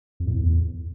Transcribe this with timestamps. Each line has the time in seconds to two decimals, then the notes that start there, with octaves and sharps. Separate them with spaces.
0.20 F2
0.27 A2
0.34 E2